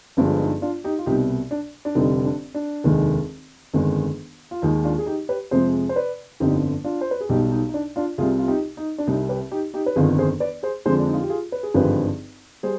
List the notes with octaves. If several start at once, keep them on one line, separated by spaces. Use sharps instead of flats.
G1 G2 F3 G#3 D4
D#4
D4 F4
D#4 G4
F4
C2 B2 G3 D#4 G4
D4
D4
F1 F2 D3 G3 D#4
D4
D4
F1 D#2 D#3 G#3
G1 F2 D#3 G#3
F4
D#2 D#3 G#3 D#4
D4 F4
G#4
D#4 G4
G4 B4
F2 C3 F3 G#3 G#4 C5
C5
B4 D5
G1 F2 D3 D#4 G4
D4 F4
C5
B4
G#4
B1 B2 G3 D#4 G4
D#4
D#4
D4
D4 F4
C2 C3 G3 F4 G#4
F4
D#4 G4
D#4
D4
C2 C3 G3 D#4
G4 B4
D#4 G4
D#4 G4
B4
G1 F2 D#3 F4 G#4
G#4 C5
B4 D5
G#4 C5
F2 D3 F3 G#3 G#4 C5
D4
D#4
F4
G4
F4 G#4
B4
G#4
G#1 G2 D3 F3 G#3 G4 B4
G3 G#4 C5